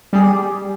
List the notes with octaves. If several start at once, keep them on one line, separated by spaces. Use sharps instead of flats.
G3 G#4
G4